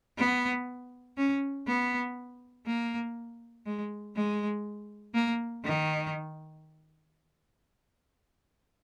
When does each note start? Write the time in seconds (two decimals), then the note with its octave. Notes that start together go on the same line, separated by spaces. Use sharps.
0.18 B3
1.17 C#4
1.67 B3
2.67 A#3
3.66 G#3
4.16 G#3
5.15 A#3
5.64 D#3